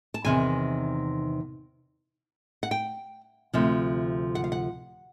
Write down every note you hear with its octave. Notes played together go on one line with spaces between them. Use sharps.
A5
E2 C3 D#3 G#5
F#5
G5
D2 C3 F3
F#5
F5
F#5